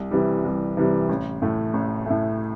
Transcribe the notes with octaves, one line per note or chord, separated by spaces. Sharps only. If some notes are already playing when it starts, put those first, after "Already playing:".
Already playing: C2
C3 E3 G3
C2
C3 E3 G3
A1
A2 A3
A1
A2 A3